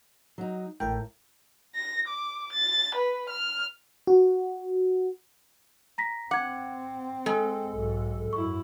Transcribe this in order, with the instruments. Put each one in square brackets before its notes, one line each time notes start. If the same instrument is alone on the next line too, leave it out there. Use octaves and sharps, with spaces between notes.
[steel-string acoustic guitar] F#3 D#4
[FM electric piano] A1 A#4 G5 [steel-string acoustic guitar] A2
[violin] A#6
D6
A6
B4
F6
[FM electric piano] F#4
[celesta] A#5 A#6 B6
[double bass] C4 [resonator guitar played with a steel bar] F#5 [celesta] D6 G#6
[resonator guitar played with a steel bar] G#3 [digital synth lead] A4
[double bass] B1 G#2
[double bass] F#2 E4 [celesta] C#6